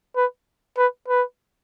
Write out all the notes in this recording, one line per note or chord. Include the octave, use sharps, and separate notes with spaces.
B4
B4
B4